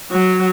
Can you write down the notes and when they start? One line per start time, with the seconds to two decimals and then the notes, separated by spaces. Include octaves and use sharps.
0.11 F#3